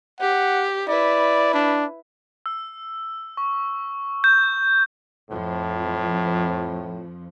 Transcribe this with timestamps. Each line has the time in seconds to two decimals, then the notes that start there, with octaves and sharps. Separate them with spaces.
0.20 G4 F#5
0.88 E4 B4 D5
1.54 D4
2.46 E6
3.37 C#6
4.24 G6
5.30 F2 A2 F3